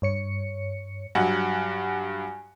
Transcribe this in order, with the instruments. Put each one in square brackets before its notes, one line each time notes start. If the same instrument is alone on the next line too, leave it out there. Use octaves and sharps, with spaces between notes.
[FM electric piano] G2 C#5 C#7
[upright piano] G2 F#3 F#5 [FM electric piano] G#5